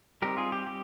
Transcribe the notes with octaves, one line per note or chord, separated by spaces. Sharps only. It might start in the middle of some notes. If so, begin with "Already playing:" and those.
G3 C4 D#4 G4 A#4
F4 G#4
G4
G4